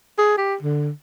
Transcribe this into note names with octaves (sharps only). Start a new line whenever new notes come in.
G#4
G4
D3